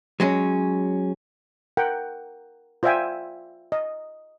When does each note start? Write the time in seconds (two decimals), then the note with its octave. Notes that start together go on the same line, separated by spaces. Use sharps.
0.20 F#3 G#3 C#4
1.77 A#4 F#5 G5
2.83 F4 C5 D5 E5 G5 G#5
3.72 D#5